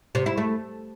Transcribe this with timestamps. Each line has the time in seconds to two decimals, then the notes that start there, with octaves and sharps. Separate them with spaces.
0.15 C3
0.26 E4
0.37 A3